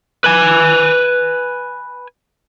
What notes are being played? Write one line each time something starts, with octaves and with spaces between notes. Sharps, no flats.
B4 G#5